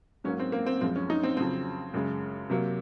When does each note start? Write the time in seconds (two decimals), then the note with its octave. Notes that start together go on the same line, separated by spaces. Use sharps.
0.24 G#2 F#3 A#3 C#4
0.39 C4
0.52 A#3
0.66 C4
0.81 F#2 F3 G#3 C4
0.96 C#4
1.10 D#4
1.23 C4
1.37 F2 C#3 F#3 C4
1.94 F#2 C#3 G#3
2.50 C3 F#3 A#3